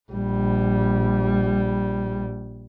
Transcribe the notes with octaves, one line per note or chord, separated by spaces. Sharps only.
A#1 G3